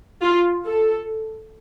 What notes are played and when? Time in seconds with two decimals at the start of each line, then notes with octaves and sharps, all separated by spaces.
0.21 F4
0.65 A4